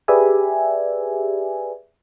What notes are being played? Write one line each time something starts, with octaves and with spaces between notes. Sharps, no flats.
G4 G#4 B4 D5 E5 G#5